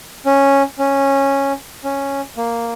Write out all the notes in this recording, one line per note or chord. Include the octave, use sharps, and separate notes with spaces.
C#4
C#4
C#4
A#3